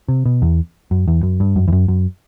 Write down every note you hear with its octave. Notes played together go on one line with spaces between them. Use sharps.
C3
B2
E2
F#2
E2
F#2
G2
F#2
E2
F#2
F#2